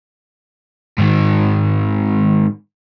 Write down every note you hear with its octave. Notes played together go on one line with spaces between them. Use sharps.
G#2 D#3